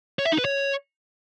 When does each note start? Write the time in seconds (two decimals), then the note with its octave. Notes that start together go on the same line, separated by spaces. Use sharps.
0.19 C#5
0.25 E5
0.32 D#4
0.38 B4
0.45 C#5